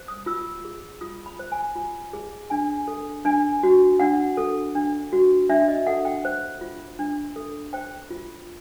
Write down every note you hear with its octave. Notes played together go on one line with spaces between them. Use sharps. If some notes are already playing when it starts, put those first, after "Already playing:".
Already playing: C5
D#6
F4 E6
G#4
F4 D#6
B5
C5
G#5
F4
G#4
D4 G#5
A4
D4 G#5
F#4
D4 F#5
A4
D4
F#4
D4 E5
D#5
A4 F#5
G5
C5
F4
D4
A4
C5 G5
F4